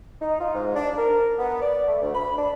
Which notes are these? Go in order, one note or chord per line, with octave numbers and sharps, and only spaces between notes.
D#4
F4
G#2
D4
A#4
B3
D5
A3
D2
B5
D4